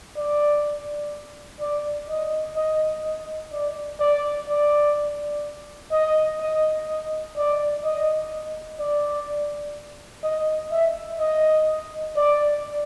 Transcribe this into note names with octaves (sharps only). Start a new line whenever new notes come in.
D5
D5
D#5
D#5
D#5
D5
D5
D5
D#5
D#5
D#5
D5
D#5
D5
D#5
E5
D#5
D5